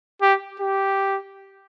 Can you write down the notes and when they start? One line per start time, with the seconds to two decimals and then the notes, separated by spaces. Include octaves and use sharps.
0.22 G4
0.60 G4